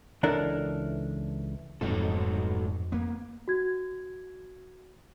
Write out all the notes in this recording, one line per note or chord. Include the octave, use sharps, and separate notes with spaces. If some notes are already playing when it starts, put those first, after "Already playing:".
C#2 E3 D4 A4 A#4
D1 F2 G#2 F3 F#3 D#4 A4
A#3 B3
F#4 G#6